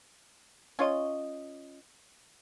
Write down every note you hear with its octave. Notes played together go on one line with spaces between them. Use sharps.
C#4 F4 C#5 D#5